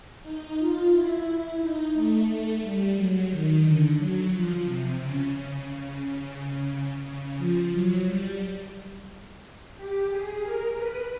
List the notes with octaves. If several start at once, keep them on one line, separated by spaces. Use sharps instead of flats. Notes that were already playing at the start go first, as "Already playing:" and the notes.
D#4
F4
E4
D#4
A3
A3
G3
F#3
D#3
D3
F#3
F3
C3
C#3
C#3
C#3
C#3
F3
F#3
G3
G4
G#4
A#4
B4